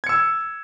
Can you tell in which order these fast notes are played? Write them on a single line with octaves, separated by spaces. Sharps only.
G#6 C#7 E6